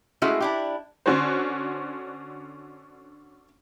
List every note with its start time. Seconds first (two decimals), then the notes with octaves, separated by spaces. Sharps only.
0.22 G#3 A3 C#4 E4 F#4 G#4
0.40 D4 E4 G4
1.06 D3 C#4 D4 F#4 C5